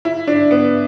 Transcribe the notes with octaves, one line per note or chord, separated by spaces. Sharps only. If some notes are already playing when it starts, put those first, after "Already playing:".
E4
D4
B3